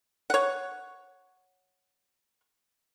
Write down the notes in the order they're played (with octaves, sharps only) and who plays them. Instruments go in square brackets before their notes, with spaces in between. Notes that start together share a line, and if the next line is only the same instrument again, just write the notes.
[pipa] C#5 F#5